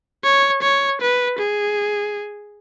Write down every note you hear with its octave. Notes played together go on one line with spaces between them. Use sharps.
C#5
C#5
B4
G#4